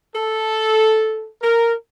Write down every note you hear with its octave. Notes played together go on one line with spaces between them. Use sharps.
A4
A#4